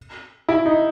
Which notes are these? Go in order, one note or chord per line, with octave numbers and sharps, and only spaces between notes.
E4
D#4